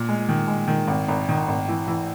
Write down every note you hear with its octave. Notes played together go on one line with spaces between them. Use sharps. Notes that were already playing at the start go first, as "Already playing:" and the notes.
Already playing: A#2
G#3
D#3
G#3
D#3
G#1
G#1
D#3
G#1
E3
E3